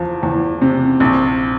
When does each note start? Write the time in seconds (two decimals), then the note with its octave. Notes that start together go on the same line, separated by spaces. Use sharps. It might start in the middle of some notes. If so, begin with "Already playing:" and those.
Already playing: E2 F3
0.23 E2
0.62 C3
1.00 A#1